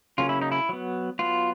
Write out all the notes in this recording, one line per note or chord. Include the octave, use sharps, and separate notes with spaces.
C#3 F#3 A#3 C#4 F4
E4
D#4
E4
F#3 B3
F#3 B3 F4